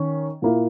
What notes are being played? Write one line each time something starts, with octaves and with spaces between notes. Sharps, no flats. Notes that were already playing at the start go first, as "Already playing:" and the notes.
Already playing: D#3 C#4
A#2 A#3 E4